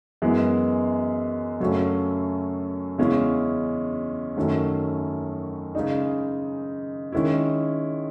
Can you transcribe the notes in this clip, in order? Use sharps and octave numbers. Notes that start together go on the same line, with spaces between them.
F#2 E3 G#3 B3
F#2 C#3 F#3 A3 C#4
E2 C#3 G#3 C#4 E4
F#2 D#3 F#3 A3 C#4
C#3 G#3 D#4
D#3 G#3 C#4 E4